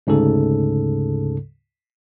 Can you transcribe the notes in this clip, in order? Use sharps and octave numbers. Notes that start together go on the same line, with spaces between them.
D2 G#2 C#3 A4